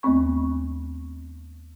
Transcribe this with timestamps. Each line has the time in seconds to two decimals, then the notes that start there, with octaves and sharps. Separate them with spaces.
0.03 D#2 A3 B3 C4 C#6